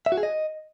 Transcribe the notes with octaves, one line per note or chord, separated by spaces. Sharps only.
E5
F#4
G#4
D#5